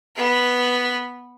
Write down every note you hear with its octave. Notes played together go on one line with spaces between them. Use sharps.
B3 B4